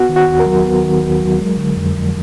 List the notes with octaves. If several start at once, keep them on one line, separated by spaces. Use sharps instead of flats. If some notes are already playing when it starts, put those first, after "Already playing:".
Already playing: B3 F#4
D#3
F#4
D#2
A#4
F#3
B3
D#3
D#2
F#3
G#3
D3
F2
F3